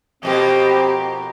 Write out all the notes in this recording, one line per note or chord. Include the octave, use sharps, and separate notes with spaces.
F2 B2 A#3 C4 G4